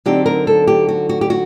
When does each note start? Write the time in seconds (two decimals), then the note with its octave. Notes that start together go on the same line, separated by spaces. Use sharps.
0.06 D3 F#3 C4 D#4 G4
0.26 A#4
0.47 A4
0.67 G4
0.89 F#4
1.09 F#4
1.21 G4
1.30 F#4